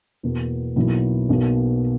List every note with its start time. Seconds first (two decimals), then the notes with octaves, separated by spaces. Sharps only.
0.23 E2 B2 A#3
0.76 B1 B2 F#3 A#3 E4
1.29 B1 B2 A#3